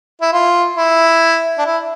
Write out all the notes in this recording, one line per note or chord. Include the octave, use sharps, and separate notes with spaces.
E4
F4
E4
D4
E4